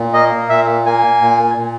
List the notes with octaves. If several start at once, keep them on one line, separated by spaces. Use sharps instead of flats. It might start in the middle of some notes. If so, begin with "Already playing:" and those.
Already playing: A#2
A#3 D#5
A#2 E5
A#3 G#5
A#2
A#2